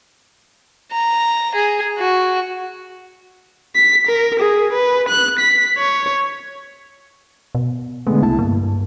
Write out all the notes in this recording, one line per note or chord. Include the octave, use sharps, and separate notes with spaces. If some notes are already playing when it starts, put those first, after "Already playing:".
A#5
G#4
F#4
B6
A#4
G#4
B4
F#6
B6
C#5
B2
D3 G#3 A3 B3
C2 E4 A5
G2 A#3